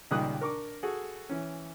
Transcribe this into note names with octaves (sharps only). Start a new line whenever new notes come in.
C#2 A#2 D#3 G3 D#6 F#6
D4 A#4 C#6 D6
F#4 G#4 A4
E3 C#4